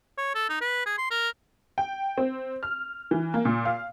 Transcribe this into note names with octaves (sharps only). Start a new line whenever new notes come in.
C#5
A4
D#4
B4
G#4
C6
A#4
G5
C4
F6
E3
A#3
A#2
F5